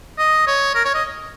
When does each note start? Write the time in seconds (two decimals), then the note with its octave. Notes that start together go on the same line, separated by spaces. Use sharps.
0.18 D#5
0.47 C#5
0.75 A#4
0.85 C#5
0.95 D#5